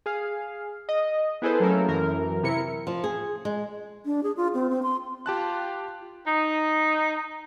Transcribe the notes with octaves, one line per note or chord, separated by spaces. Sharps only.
G#4 F5
D#5
B3 E4 G#4 A4 B4 C5
F#3 A3 A#3 C#4 A4 A#4
F#2 E3 A#4
C3 E4 A#4 C#7
F3
G#4
G#3
D4
G#4
F4
C4
C4
C6
F4 G4 A5 F#6
D#4